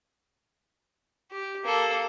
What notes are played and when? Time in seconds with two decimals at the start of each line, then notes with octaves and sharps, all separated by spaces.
1.31 G4
1.64 A#3 A4